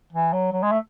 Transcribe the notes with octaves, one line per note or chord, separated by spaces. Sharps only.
E3
F#3
F#3
G#3
A3